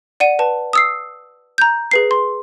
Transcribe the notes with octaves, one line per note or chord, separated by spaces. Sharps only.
D5 F#5 D#7
B4 A5
D#6 E6 C7
A#5 G6
G#4 B4 C7
C6